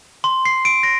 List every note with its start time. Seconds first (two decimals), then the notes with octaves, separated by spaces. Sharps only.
0.24 C6
0.45 C7
0.65 D7
0.83 A#6